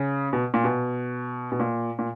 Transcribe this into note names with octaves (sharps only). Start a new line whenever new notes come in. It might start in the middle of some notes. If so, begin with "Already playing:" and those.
Already playing: C#3
B2
A#2
B2
B2
A#2
A#2